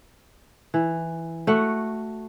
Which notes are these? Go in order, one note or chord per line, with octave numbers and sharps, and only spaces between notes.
E3
A3 F#4 F#5